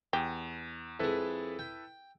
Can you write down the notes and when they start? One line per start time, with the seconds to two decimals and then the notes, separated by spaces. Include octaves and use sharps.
0.13 E2 G4
1.00 F2 G#3 E4 A4 B4
1.59 G5